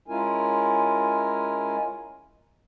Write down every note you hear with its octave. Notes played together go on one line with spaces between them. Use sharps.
G#3 C#4 E4 F4 A#4 G#5